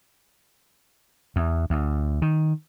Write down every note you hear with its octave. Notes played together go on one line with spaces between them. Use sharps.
E2
D2
D#3